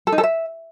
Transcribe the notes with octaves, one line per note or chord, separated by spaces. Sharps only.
A4
D#4
A4
E5